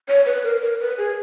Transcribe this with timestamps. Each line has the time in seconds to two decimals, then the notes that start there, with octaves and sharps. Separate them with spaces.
0.09 C#5
0.26 B4
0.44 A#4
0.62 A#4
0.80 B4
0.98 G#4